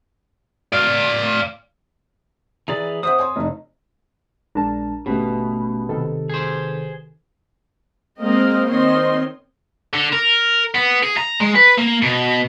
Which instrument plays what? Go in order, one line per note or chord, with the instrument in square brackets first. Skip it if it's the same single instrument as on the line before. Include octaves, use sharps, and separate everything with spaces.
[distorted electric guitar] D5 F5
[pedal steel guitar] E3 G#4 D5 [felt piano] A#5
[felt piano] C5 E5 F#5 [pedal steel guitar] D#6
[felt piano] C#5 G#5 C6
F1 D#4
[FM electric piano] A#1 G#3 A#5 [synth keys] D4 A#4 A5
[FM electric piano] G#1 G4 B4 [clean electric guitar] B2 [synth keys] A3 C#4
[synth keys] C3 D#3 A4
[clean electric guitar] G#4 C5
[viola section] G#3 A#3 C4 A#4 D#5 F5
D#3 C4 C#5 D#5 C6
[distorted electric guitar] D3
A#4
B3
G#4
A#5
G#3
B4
A#3
B2